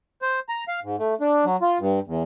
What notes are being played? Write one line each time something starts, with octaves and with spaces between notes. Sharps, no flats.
C5
A#5
F5
G#2
A3
D4
F#3
F4
G2
E2